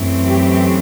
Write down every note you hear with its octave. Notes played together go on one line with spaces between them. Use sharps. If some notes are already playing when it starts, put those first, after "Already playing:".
Already playing: F#2 E3 A3 C4
G4